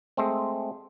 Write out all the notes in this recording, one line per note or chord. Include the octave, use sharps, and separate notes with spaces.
G#3 A3 C4